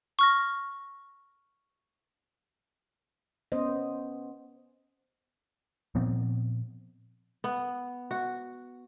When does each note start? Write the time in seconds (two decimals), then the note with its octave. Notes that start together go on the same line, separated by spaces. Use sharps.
0.19 C#6 F6 A#6
3.52 B3 C#4 C5 D#5
5.95 A#2 F3 B3 C4
7.44 B3
8.11 F#4